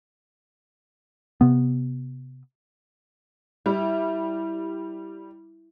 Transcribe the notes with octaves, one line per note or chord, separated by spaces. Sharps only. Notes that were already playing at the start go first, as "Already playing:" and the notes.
C3 B3
G3 E4